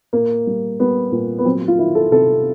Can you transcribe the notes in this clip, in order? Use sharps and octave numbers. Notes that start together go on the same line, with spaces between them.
A#2 A#3
G3
G3 B3
A#2
B3
F#3 C4
F4
D#3 E4
A4
C3 A4